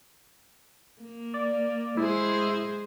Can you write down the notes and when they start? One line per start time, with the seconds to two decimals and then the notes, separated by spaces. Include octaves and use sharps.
1.02 A#3
1.34 D5
1.97 G#3 E4 G#4 C5